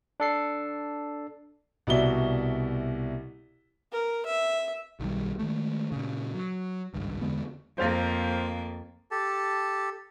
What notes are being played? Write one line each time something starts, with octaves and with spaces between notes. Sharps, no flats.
D4 A4 C7
C2 B2 F#4 D5 E5 G7
A#4
E5
B1 D#3 G3
D#3 G#3 A3
A#2 C#3
F#3
G#1 C#2 G2
E2 D3 G#3 B3
F2 A#3 C5 F5 A6
G4 A4 A5